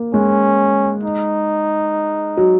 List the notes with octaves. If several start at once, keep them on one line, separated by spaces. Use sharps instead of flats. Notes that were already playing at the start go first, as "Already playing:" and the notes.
Already playing: A#3
G#3 C#4
D#4
F#3